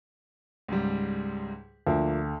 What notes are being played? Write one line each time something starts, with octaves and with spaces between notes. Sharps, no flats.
C#2 G#2 G3
D2 F3 A#3